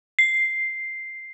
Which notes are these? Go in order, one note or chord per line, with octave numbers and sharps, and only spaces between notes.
C7